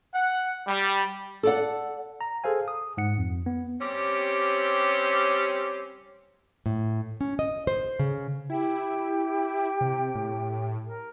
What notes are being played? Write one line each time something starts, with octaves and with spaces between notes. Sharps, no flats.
F#5
G3
A4 D5 F#5
A#5
G#4 A4 C5 F5 G#5
D#6
G#2 F#5 C#7
F2
B3
G3 C4 C#4 G4
A2
C#4
D#5
C5
C#3
E4 G4 G5
C3
A2
A#4